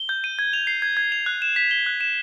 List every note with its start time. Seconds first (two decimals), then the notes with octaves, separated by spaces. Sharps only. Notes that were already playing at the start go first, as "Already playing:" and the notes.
Already playing: G7
0.09 G6
0.24 D#7
0.39 G#6
0.53 F7
0.67 C7
0.82 G#6
0.97 G#6
1.12 F7
1.26 F#6
1.42 E7
1.56 B6
1.71 G7
1.86 F#6
2.01 E7